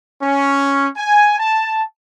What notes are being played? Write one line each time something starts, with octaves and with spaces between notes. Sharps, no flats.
C#4
G#5
A5